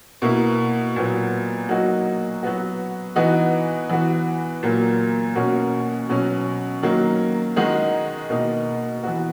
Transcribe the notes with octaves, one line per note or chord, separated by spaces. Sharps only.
B2 A#3 E4
A#2 F#3 B3
F#3 A#3 D#4 F#4
F#3 B3 F#4
E3 B3 D#4 F#4
E3 B3 F#4
A#2 F#3 A#3
B2 A#3 C#4 F#4
B2 F#3 C#4
D#3 F#3 A#3
D#3 G#3 D#4 F#4
B2 A#3 D#4
E3 B3 F#4